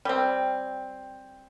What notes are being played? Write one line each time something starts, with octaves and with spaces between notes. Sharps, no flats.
G3 C4